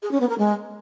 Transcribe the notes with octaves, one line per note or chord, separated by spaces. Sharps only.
G#4
C#4
B3
A#4
G#3